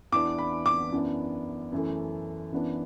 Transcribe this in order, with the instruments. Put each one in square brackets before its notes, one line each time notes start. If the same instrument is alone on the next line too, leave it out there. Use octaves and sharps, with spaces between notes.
[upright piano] E2 E3 B3 D4 D6
B5
D6
F#2 E3 B3 D4
F#2 E3 A3
F#2 E3 B3 D4